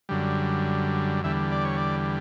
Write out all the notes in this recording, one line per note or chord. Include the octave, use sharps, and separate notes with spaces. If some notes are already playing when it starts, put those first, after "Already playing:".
F#2 D3 G3
E2 D3 G3 E5
D5
C#5
D5